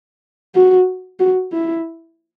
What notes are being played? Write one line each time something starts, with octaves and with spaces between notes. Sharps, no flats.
F#4
F#4
E4